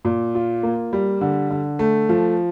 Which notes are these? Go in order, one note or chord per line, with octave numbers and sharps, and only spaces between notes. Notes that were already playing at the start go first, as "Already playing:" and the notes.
A#2
F4
A#3
G3
D3
D3
A3
F3